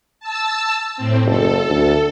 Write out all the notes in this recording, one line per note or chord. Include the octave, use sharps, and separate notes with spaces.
A5 E6
A2 C4
F#1 A4
D2